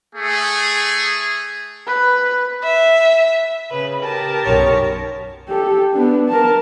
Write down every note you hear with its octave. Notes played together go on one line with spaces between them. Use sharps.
A3 G#4
B4
E5
C#3 B4
G4 A#4 A5
B1 F#2 C#5
G4 A4
B3 D4
A#4 A5